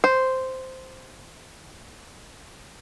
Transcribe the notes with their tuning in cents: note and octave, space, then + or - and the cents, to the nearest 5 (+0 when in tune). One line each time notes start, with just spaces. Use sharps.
C5 -5